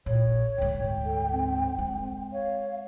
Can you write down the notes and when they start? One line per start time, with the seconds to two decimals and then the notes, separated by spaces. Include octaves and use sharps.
0.06 A#1 C#5
0.58 D2 G#2 G5
1.05 A4
1.32 C4
1.78 G#3
2.32 C#5 F5